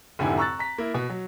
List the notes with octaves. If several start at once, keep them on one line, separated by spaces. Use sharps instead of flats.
F1 G#2 D3 E4 G4 G#5
A#5 C#6 E6 F#6 A6
A#5 B6
A#3 E4
B2
F#3